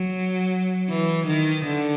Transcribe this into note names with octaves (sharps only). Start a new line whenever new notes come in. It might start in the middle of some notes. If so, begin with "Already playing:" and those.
Already playing: F#3
E3
D#3
D3